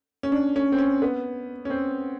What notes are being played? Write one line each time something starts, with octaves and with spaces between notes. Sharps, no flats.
C#4
D4
C#4
C4
C#4
B3
C#4
C4